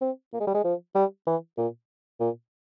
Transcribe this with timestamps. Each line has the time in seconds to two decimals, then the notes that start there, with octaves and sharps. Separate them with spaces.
0.01 C4
0.33 A#3
0.41 G#3
0.47 G3
0.54 G#3
0.64 F3
0.95 G3
1.27 E3
1.58 A#2
2.20 A#2